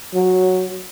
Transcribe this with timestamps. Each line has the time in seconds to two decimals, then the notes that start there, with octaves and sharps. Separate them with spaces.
0.14 F#3